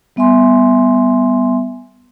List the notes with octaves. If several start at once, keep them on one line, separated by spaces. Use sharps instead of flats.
G3 B3 E5 G#5 C6